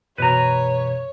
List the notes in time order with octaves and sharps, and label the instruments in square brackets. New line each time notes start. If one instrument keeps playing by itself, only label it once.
[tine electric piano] F#2 B2 E3 [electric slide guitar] B4 A#5 [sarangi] C#5